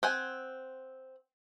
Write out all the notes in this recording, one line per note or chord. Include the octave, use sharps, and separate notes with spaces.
C4 F#5 G#5